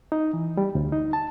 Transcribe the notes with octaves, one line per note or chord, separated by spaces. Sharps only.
D#4
E3
G3
D2
D#4
A5